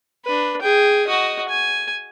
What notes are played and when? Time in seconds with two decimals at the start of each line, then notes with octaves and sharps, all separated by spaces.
0.25 D4 B4
0.61 G#4 G5
1.07 F#4 D#5
1.48 G#5